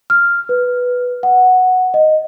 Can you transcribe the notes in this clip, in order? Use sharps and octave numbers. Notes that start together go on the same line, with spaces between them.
F6
B4
F#5
D#5